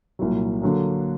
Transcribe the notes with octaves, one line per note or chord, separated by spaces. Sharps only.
C2 A#2 F#3
D3 F#3 A#3